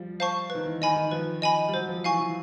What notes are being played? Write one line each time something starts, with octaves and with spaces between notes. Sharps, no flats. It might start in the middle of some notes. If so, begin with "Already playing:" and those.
Already playing: F3 G3
C5 F5 A5 C#6
B4
D#3
E3
D#3 D#5 G#5 B5
D#3
F3 B4
D#5 G#5 B5
G3
F#3 C5
F3
E3 F5 G#5 C#6
E3